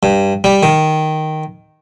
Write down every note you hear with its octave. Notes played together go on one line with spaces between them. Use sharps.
G2
G3
D#3